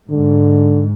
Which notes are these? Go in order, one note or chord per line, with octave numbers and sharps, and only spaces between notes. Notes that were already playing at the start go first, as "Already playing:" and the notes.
G#2 D3